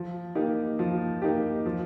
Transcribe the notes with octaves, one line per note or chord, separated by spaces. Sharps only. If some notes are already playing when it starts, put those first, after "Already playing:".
Already playing: F3
A#3 D#4 G4
F3
A#3 D#4 G4
F3